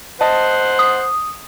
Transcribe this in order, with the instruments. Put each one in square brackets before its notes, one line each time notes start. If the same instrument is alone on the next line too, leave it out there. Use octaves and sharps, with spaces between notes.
[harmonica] C5 F#5 [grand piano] D#5 A5
[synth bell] D#6